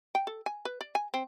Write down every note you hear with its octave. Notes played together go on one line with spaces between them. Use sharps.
G5
A4
G#5
B4
D5
G#5
C4